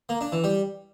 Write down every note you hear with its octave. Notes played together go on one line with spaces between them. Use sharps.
A#3
D4
E3
G3